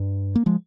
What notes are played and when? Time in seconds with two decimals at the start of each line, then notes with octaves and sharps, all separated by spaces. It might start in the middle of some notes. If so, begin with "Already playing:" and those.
Already playing: G2
0.36 A#3
0.46 F3 G#3